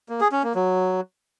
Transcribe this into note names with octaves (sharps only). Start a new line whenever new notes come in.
A#3
G#4
C#4
A#3
F#3